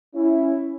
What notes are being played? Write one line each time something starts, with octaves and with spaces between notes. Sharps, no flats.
C#4 E4